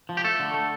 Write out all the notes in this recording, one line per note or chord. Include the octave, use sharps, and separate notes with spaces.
F3
G4
A3 A4
D3
A3